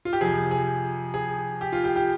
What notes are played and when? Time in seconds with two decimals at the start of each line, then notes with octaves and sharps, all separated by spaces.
0.05 F4
0.13 G4
0.21 F2 C3 F3 G#4
0.51 G#4
1.14 G#4
1.61 G4
1.73 F4
1.84 G4
1.96 G4